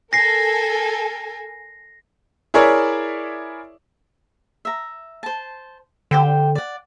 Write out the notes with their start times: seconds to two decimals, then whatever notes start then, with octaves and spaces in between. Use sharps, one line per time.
0.13 A4 A#4 G#5 A#6 C7
2.54 E4 G#4 A#4 C#5 D5 E5
4.65 E5 A#5
5.23 C5 A5
6.11 D3 G4 C5 G5
6.55 D5 F#5